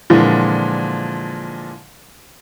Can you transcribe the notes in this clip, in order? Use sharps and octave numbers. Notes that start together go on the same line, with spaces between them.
A#2 D3 E3 F3 G#3